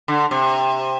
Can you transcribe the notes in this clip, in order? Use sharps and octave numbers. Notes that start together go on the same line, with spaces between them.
D3
C3